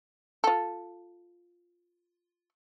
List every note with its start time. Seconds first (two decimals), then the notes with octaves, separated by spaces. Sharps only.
0.44 F4 A4